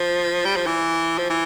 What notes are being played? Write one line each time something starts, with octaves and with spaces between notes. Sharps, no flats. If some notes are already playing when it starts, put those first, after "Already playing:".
Already playing: F3
G3
F3
E3
F3
E3